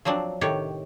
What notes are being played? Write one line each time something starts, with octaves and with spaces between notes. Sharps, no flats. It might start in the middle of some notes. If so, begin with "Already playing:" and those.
F3 F#3 C4 D4
A2 C3 D#3 G4 C#5